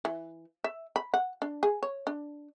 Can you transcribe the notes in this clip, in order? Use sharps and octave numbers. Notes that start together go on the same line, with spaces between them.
E3
E5
B5
F#5
D4
G#4
C#5
D4